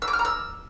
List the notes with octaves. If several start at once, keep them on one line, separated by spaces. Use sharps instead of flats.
E6
D6
F6
A#5
E6